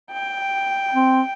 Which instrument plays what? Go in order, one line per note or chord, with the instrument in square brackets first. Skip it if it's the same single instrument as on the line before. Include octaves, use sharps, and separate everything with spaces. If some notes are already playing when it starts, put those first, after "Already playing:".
[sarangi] G5
[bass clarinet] C4